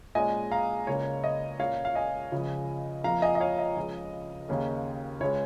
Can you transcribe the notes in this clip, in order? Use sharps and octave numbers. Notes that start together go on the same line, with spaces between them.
A#2 G#3 C#4 D#5 G#5
F5 A#5
C#2 C#3 A#3 C#4 C#5
D#5
A#2 A#3 C#4 C#5 F5
F5
D#5 G#5
C#2 C#3 F3
F2 F3 A#3 F5 A#5
D#5 G#5
D#5
C#5 F5
D#5
C#2 C#3 F3 C#4
D#2 C#3 A#3 C#4
C#2 C#3 G#3 C#4 C#5